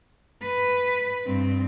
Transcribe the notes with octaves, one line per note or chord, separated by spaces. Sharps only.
B4
G2 C4